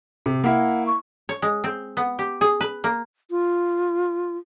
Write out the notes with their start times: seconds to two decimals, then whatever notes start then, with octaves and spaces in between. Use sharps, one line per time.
0.26 C3
0.44 A#3 E4 F#5
0.87 C#6
1.29 C#5
1.42 G#3
1.64 C4
1.97 B3
2.19 G4
2.41 G#4
2.61 B4
2.84 A#3
3.31 F4